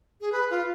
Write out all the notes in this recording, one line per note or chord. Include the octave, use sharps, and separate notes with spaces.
G#4
B4
F4